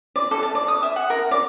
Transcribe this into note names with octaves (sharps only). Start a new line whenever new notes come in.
D5
A4
A5
D5
D#6
E5
F#5
A#4
D5